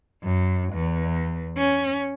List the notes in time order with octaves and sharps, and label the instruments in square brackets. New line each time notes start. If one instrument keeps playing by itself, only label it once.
[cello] F#2
E2
C#4